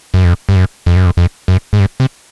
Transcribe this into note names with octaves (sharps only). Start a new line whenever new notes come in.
F#2
F2
G2
F#2
F2
F#2
F2
F2
F#2
G#2
G2
C3